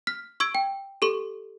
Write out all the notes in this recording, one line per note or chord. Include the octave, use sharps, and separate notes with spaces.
F6 B6
C#6 E6 G#6 D7
G5
G4 A4 C#6